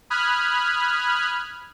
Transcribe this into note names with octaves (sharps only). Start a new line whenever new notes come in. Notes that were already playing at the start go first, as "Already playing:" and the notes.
B5 D#6 F6 F#6 G#6